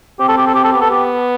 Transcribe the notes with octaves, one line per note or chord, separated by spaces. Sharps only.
C4 G4
A4
G4
A4
G4
A4
B3 G4
A4
G4